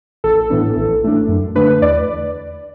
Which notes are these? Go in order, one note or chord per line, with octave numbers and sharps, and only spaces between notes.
A1 A4
A2 E3 B3 D4
A1
A2 A3 D4
F#2
D3 A3 D4 B4
E2 D5